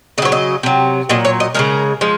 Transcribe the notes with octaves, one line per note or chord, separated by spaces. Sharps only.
C#3 F#3 C#5 D#5
D#5
C3 F#3
A#2 F#3 D#5
C#5
D#5
C#3 F3 G#3 A#4
F3 G#3